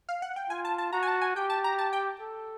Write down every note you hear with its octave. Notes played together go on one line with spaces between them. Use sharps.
F5
F#5
G5
F4 G#5
A5
A5
F#4 A#5
G#5
A5
G#5
G4 G5
A5
A#5
A5
G5
A4